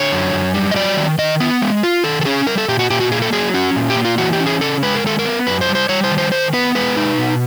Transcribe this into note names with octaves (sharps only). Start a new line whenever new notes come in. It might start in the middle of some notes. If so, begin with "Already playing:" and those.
Already playing: D3 C#5
F#2
F#2
G3
D#5
F#3 D5
D#3
D#3 D#5
B3
G#3
F4
D#3 A4
A4
C#4 G#4
G3 A#4
A4
A#2 G4
F#4
A#2 G4
F#4
A#3 G#4
A4
F#3 G#4
C#4 F#4
A#2
G4
A#3
F4
E3 F#4
G4
C#4
G#4
C#3 A4
G#3 B4
A#4
D#3 A4
A#4
B3
F#2 B4
C5
G3
C5
G3 C#5
C5
D#3
C5
D#3 C5
B3 B4
G#3 B4
D#4
B2